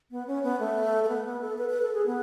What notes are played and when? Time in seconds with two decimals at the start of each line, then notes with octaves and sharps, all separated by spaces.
0.11 B3
0.27 C#4
0.43 B3
0.60 A3
1.04 A3
1.08 B3
1.26 B3
1.41 A4
1.58 B4
1.70 B4
1.82 A4
1.94 G#4
2.06 B3